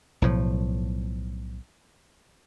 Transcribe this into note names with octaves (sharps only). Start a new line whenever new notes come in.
B1 A2 F3